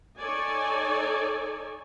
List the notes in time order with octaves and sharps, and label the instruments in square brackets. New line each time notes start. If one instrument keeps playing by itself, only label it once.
[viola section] D#4 A4 C#5 D5 G#5